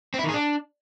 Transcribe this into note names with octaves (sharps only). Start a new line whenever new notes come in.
C4
E4
D#3
G#4
D4